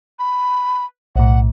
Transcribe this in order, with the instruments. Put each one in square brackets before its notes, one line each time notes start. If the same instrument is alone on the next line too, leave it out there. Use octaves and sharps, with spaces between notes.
[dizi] B5
[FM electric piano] B1 A2 [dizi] F#5